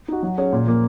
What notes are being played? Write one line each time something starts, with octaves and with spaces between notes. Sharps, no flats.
D#4 F#4
F#3
C#4 G#4 C#5
A#2
F3 A#3